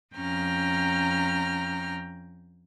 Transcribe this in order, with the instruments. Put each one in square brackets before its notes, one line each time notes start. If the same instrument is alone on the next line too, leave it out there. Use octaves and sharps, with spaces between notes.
[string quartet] F2 C#4 G5 A#5 F6